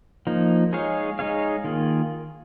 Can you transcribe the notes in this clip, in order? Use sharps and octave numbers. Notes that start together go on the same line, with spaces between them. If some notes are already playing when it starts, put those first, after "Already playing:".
F3 A#3 D#4
G#3 D#4 G#4 C#5 F5
G#3 D#4 G#4 C#5 F5
D#3 A#3 F4 G#4